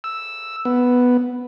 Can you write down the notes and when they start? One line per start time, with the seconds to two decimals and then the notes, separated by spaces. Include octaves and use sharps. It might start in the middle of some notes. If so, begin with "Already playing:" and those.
0.04 E6
0.65 B3